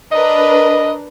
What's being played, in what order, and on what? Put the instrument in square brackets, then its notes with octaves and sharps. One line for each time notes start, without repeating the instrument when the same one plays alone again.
[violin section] D4 A#4 B4 [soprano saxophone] D#5